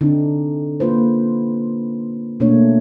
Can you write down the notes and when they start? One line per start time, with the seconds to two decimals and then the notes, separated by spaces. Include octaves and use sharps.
0.01 D3 C4 D4 D#4
0.80 A#3 F4 B4 C5
2.40 B2 A3 A#3 D4 C#5